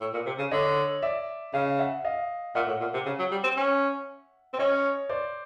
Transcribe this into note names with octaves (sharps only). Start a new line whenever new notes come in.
A2
A#2
C3
C#3
D3 C#5 D#5
D5 E5
C#3 D#5 F5
E5 F#5
D#5 F5
A#2 E5 F#5
A2
A#2
C3
C#3
F#3
G3
C4
C#4
C4
C#4 C#5 D#5
C5 D5